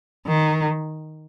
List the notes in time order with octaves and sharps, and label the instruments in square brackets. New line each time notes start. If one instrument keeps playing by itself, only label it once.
[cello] D#3